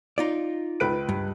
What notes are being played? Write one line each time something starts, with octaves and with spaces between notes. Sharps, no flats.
D#4 F4 D5
C#2 B4 D7
G2